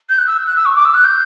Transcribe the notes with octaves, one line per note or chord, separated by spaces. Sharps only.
G6
F#6
E6
F#6
E6
C#6
D6
E6
F#6
G6